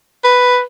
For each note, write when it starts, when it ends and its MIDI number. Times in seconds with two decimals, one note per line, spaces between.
0.24 0.61 71